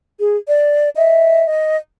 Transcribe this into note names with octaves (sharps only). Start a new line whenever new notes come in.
G#4
D5
D#5 E5
D#5